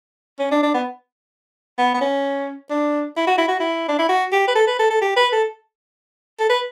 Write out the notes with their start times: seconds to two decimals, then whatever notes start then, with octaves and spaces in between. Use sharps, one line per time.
0.39 C#4
0.52 D4
0.63 D4
0.74 B3
1.78 B3
1.94 B3
2.01 C#4
2.70 D4
3.16 E4
3.27 F#4
3.38 E4
3.48 F#4
3.60 E4
3.88 D4
3.99 E4
4.09 F#4
4.32 G4
4.48 B4
4.55 A4
4.67 B4
4.79 A4
4.90 A4
5.01 G4
5.16 B4
5.32 A4
6.40 A4
6.49 B4